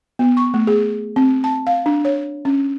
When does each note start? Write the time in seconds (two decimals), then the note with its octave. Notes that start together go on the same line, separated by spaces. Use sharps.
0.19 B3
0.37 C#6
0.54 A3
0.67 G#4
1.16 C4
1.44 A5
1.67 F5
1.86 D4
2.05 C#5
2.45 C#4